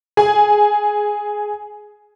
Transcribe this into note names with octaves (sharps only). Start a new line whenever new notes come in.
G#4 G#5